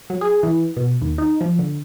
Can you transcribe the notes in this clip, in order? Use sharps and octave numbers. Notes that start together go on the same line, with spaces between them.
F#3
G#4
E3
B2
D#2
D#4
F3
D3